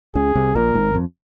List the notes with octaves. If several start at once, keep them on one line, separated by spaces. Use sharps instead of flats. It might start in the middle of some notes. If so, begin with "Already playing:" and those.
C#2 C#3 G#4
C2 C3
A#1 A#2 A#4
G#1 G#2
F2